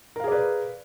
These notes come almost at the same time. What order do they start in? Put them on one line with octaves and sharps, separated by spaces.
A#4 F5 G#4 D5 B4